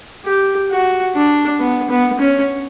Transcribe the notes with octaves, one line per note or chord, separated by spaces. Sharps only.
G4
F#4
D4
B3
B3
C#4